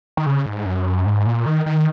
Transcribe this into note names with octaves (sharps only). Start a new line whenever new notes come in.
D#3
C#3
G#2
F#2
G#2
A#2
D#3
D#3